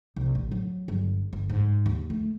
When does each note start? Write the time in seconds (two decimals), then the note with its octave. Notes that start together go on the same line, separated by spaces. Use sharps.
0.16 C2
0.35 A1
0.51 F#3
0.88 G1
1.33 G1
1.50 G#2
1.86 D#2
2.10 A3